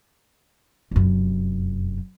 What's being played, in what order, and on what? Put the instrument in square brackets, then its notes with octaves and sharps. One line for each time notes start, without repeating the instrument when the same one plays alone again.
[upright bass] F1 F#2